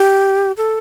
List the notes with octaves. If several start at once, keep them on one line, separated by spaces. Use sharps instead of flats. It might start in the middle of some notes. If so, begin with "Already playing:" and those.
Already playing: G4
A4